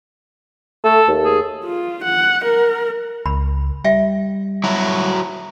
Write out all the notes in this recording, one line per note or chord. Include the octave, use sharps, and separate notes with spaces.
A3 A4
D#2
G#4
F4
F#5
A#4
C#2 B5
G3 E5 F5 G5
F#3 E4 F#4